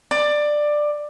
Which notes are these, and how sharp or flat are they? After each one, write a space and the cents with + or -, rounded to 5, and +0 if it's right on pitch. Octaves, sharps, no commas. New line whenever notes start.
D5 +15